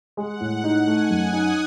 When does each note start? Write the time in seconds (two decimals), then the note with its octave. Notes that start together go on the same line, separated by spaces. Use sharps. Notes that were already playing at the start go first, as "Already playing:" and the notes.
0.17 G#3 F#5
0.40 A2
0.64 D#4
0.87 A3 G#5
1.10 F#2
1.22 D#6
1.33 D#4